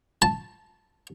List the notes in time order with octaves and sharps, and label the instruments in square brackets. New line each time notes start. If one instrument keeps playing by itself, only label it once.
[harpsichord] A5